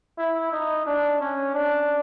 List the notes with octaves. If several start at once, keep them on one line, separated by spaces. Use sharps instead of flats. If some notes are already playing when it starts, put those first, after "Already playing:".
E4
D#4
D4
C#4
D4